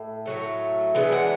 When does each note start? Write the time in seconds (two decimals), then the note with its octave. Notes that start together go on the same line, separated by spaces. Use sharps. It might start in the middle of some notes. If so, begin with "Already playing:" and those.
Already playing: A2
0.26 A2 F#3 A3
0.95 E3 G#3 B3 D4
1.12 F#5